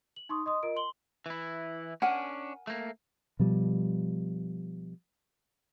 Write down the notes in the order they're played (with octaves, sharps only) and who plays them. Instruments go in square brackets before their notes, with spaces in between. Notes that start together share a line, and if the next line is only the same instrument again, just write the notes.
[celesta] F#7
D#4 C6 C#6 D#6
D#5 C6 D#6
F4 A#4 D#5 D7
C6 F#7 G7
[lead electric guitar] E3 E4
[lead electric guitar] C#4 D4 [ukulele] A#4 F#5 G#5
[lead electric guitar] A3 A#3
[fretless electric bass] B2 F3 G3